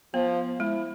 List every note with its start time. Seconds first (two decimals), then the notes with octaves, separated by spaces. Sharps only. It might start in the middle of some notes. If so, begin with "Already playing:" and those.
0.14 F3 B3
0.60 G#3 E4